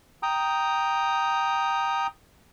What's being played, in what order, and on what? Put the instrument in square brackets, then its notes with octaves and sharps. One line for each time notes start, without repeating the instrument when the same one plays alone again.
[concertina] G5 A#5 D#6